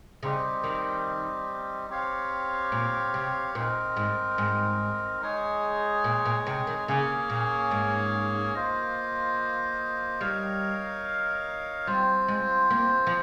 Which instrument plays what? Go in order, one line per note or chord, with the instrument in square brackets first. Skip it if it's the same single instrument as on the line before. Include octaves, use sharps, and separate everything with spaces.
[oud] C#3 [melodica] G3 C4 D#4 G4
[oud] D#3
[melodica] C4 G4 C#5 F5
[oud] A#2
C3
[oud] A#2 [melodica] C4 D#4 A#4
[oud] G#2
G#2
[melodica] G#3 D#4 G#4 C#5
[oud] A#2
A#2
C3
D#3
[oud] C#3 [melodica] A#3 C#4 G#4 C#5
[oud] A#2
G#2
[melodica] A#3 F4 C5 D#5
[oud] G3 [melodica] D#4 A#4 C#5 F5
[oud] G3 [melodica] C4 F4 C5
[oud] G#3
A#3
F3